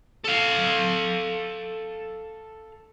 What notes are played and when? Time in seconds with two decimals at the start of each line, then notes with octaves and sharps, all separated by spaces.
0.24 A4 F5